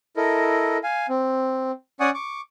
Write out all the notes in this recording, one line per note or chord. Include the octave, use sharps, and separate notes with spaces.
E4 A4 A#4 D#5
F5 G#5
C4
C#4 D5 F#5 G#5 C#6 D#6
C#6 D6